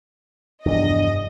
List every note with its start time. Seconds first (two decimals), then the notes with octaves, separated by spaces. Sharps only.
0.66 F1 E2 G2 D4 D#5